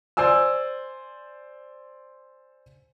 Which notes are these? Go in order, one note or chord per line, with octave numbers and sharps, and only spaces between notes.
C5 D5 G#5 E6